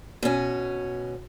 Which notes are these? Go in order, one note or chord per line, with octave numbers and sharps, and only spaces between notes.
B2 C#4